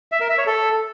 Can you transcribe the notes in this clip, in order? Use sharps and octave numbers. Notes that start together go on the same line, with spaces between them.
E5
A#4
E5
C#5
A4